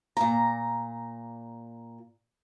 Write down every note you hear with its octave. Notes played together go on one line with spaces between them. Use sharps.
A#2 A#5